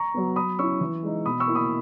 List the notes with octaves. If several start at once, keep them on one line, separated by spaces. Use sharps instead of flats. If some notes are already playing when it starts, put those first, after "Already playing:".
Already playing: A#5 C#6
F#3 B3
F#3 B5 D#6
C#4 E4 C#6 E6
E3
G#3 D#4
B2 B5 D#6
C#6 E6
A#3 E4
B5 D#6